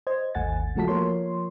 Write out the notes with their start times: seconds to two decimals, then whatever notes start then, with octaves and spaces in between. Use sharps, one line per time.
0.07 C5 D#5 G#6
0.35 G#1 D#2 A3 F#5 G#5 A6
0.75 C#3 F3 A3 F#4 A5 B6
0.88 F3 A#3 A#4 C#5 C6